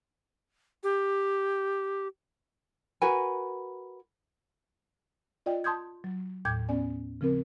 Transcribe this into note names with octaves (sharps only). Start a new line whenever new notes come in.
G4
F#4 A#4 B4 G#5
F4 D5 D#5 G5
A5 C6 D#6 G6 G#6
F#3
D#2 A2 G5 D6 G6 G#6
B3 C#4 D5 G#5
C#3 F3 C4 A#4